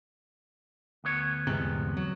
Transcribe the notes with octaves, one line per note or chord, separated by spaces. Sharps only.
D2 B3 C#5
E2 G#2 C3
F#3